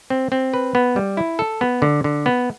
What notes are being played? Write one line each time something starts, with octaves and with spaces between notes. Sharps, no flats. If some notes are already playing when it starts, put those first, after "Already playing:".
C4
C4
B4
B3
G3
E4
A4
B3
D3
D3
B3